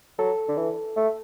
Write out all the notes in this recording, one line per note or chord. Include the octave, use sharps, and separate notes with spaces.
F#3 A4
D3
E3
A3